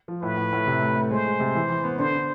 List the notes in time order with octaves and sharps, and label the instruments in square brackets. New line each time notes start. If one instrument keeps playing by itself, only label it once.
[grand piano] F3
[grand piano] A2 [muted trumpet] B4
[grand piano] A2
A2
C3
A3
A3
[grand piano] G#3 [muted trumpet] C5
[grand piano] G#3
C3
E3
E3
B3
[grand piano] D3 [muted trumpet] C5
[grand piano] D3